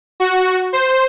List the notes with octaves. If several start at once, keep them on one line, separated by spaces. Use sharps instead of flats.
F#4
C5